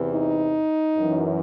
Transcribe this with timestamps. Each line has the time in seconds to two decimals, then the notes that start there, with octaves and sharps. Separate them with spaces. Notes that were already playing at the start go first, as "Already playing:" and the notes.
Already playing: E2 C3 E3
0.10 D#4
0.98 F#2 E3